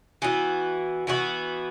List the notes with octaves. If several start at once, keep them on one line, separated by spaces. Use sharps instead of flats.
E3 B3 F#4
E3 B3 F#4